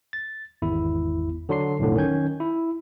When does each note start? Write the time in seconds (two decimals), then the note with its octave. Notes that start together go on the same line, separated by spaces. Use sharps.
0.13 A6
0.62 G#1 E2 E4
1.49 D3 F#3 D4 C6 C7
1.79 B1 F2 A2 D3
1.96 D#3 F#3 C#4 G6 G#6
2.40 E4